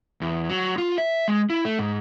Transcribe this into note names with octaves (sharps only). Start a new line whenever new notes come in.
E2
F#3
F4
E5
G#3
E4
A3
G#2